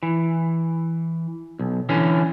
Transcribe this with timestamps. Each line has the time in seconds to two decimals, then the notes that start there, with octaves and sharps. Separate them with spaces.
0.03 E3
1.59 B1
1.89 D3 E3 C#4